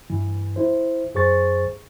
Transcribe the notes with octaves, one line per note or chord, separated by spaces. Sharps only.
G2 E3
E4 C5
F#2 G#4 C5 C#6 A6